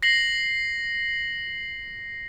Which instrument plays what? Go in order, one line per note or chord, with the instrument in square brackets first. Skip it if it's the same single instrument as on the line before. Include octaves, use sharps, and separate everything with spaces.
[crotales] A#6 C7 F#7